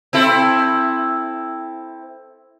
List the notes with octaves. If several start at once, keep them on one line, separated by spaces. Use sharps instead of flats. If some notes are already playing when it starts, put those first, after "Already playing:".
C4 E4 A4